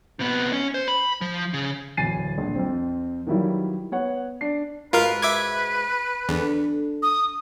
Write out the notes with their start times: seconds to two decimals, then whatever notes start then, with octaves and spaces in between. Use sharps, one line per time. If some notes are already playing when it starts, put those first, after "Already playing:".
0.19 C3 B3
0.53 C#4
0.74 C5
0.88 B5
1.21 F3
1.54 C#3
1.97 D1 E2 G#5 A6 C7 D#7
2.38 A#1
2.55 F2 C4
3.27 D#3 E3 F#3 G3 E4 F4
3.92 B3 C#5 F#5
4.41 D4 C7
4.93 G#2 F4 F#4 A#4 B4 F5
5.22 E5 D6 G#6
6.29 E2 D4 A4
7.03 D#6